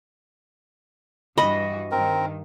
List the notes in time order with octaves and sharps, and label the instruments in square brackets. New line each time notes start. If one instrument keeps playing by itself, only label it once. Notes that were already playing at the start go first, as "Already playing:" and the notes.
[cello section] G2 E3 F#4 [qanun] D#5 [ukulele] B5
[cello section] G2 D#3 [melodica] C4 A#4